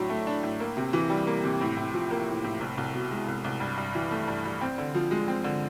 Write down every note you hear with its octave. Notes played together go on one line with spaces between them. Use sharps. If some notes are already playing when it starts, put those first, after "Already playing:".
Already playing: A2 F#3 D4
A3
D4
A2
A#3
C3
E3
G3
A#3
C3
A2
A2
F3
A#3
A2
A2
C2
C2
B2
G#3
C2
C2
G2
G2
E3
A3
G2
G2
C4
D3
F3
G#3
C4
D3